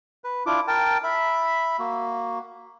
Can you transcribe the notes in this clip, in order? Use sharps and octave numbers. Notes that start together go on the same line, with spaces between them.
B4
D4 E4 F4 D6
A#4 G5 A5
E5 B5
A#3 F#4